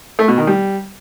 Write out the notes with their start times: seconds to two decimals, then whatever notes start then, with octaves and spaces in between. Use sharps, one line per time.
0.19 A3
0.28 B2
0.38 D#3
0.47 G3